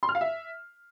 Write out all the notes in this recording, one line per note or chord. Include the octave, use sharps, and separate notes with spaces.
C6
F6
F5
E5